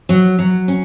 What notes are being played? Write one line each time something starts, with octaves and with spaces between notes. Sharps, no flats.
F#3
F#3
C#4